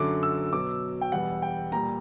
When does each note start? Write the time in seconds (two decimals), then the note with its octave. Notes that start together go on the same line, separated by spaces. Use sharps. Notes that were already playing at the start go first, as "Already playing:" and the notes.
Already playing: F#2 D3 F#3 D6
0.23 E6
0.52 B2 F#3 D6
1.01 G5
1.12 E2 B2 G3 F#5
1.42 G5
1.72 A#2 G3 A#5